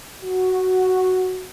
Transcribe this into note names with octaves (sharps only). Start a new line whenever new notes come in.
F#4